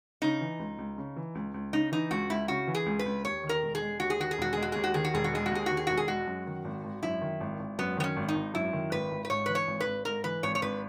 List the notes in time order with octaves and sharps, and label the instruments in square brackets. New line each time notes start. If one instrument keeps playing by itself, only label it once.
[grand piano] C#3 [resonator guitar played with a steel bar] D#4
[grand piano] E3
C#2
C#2
C#3
E3
C#2
C#2
[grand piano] C#3 [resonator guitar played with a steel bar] D#4
[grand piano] E3 [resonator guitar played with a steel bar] D#4
[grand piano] C#2 [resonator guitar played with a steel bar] F#4
[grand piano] C#2 [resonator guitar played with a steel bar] E4
[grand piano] C#3 [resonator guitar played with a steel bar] F#4
[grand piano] E3
[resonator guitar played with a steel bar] G#4
[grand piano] C#2
[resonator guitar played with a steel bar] B4
[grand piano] C#2
[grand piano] D#2 [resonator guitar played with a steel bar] C#5
[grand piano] D#3
[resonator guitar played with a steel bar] A#4
[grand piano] E1
[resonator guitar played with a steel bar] G#4
[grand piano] G#3
[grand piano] D#2 [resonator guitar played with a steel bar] F#4
[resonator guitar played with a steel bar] G#4
[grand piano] D#3 [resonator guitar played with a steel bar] F#4
[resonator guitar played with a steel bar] G#4
[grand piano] E1 [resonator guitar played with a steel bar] F#4
[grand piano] G#3 [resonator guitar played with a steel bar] G#4
[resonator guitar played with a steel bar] F#4
[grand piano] D#2 [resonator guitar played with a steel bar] G#4
[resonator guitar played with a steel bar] F#4
[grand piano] D#3 [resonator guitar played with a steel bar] G#4
[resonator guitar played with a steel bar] F#4
[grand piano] E1 [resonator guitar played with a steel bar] G#4
[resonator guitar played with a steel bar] F#4
[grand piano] G#3 [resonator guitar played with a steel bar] G#4
[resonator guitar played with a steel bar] F#4
[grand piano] D#2 [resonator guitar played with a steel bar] G#4
[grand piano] D#3 [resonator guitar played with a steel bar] F#4
[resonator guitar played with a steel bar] G#4
[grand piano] E1 [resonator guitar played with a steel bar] F#4
[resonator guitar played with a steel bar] G#4
[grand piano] G#3 [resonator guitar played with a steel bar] F#4
[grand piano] F#2
D#3
G#1
G#1
[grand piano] F#2 [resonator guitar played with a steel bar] E4
[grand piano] D#3
G#1
G#1
[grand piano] F#2 [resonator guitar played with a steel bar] B3
[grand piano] D#3 [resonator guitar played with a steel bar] B3
[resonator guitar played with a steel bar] C#4
[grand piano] G#1
[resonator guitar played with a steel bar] D#4
[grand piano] G#1
[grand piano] F#2 [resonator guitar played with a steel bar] E4
[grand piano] D#3
[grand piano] G#1 [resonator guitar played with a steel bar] B4
[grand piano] G#1
[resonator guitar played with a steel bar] B4
[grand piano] G#2 [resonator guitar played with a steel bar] C#5
[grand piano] E3 [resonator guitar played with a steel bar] B4
[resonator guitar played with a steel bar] C#5
[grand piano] G#1
[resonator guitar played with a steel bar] B4
[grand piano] G#1
[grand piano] G#2 [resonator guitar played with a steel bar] A#4
[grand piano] E3 [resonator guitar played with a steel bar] B4
[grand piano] G#1 [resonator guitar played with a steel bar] C#5
[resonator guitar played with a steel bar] C#5
[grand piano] G#1 [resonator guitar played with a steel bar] B4